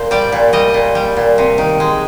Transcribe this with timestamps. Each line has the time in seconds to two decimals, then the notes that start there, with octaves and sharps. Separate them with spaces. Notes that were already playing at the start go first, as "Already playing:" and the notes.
Already playing: A#2 C5
0.11 G3 D5
0.32 A#2
0.53 G3 D#5
0.74 A#2
0.95 G3
1.17 A#2
1.38 C3
1.58 D#3
1.80 G#3